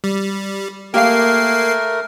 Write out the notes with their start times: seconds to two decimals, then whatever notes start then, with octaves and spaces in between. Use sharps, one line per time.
0.04 G3
0.94 A3 A#3 G4 A#4 F5 C7